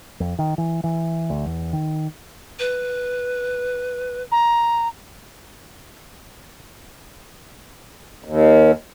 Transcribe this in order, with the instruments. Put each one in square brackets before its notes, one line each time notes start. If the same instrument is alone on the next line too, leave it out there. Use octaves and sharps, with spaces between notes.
[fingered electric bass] F2
D#3
E3
E3
D2
E2
D#3
[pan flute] B4
[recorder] A#5
[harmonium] D#2